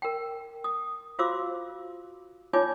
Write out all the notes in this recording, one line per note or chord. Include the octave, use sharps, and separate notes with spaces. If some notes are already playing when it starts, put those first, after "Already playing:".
A#4 G5
D#6
F4 F#4 C5 F5 D6 E6
D#4 F4 C#5 D5 G#5 D6